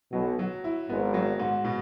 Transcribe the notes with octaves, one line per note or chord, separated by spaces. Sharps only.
B1 B2 F#3
F#3
E4
G#1 G#2 B3
F#3
G#2
B2